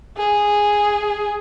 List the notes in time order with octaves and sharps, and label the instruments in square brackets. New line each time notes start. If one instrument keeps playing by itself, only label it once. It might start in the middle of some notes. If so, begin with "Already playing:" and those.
[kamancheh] G#4